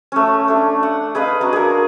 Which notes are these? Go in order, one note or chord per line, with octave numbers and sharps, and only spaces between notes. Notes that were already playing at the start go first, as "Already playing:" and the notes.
A3 C#4
A3 D4
F#5
G#4 B4 D#5 F5
D4 F#4 A#5
G#4 A#4